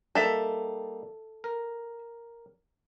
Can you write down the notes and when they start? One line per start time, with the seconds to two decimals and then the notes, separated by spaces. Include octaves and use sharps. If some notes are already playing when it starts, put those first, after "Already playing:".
0.15 G3 A#3 D#4 A4 E5
1.44 A#4